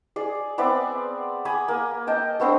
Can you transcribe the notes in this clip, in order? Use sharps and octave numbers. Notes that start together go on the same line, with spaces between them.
G#4 D5
B3 C4 D5 E5
G#5 B5 D6 D#6
A#3
D#5 G5 A5
A3 B3 C4 D4